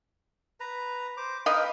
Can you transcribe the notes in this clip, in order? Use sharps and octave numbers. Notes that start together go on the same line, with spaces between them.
B4 A#5
C5 D6
A#4 B4 D#5 F5 G5